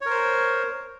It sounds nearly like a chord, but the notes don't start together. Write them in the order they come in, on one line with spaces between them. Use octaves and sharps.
C#5 A#4 C5